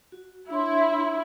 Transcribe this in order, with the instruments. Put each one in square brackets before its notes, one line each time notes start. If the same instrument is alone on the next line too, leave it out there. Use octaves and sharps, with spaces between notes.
[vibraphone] F#4
[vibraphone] D4 C#5 C6 [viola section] E4